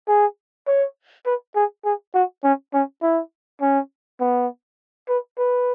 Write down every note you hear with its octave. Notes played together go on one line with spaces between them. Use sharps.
G#4
C#5
B4
G#4
G#4
F#4
C#4
C#4
E4
C#4
B3
B4
B4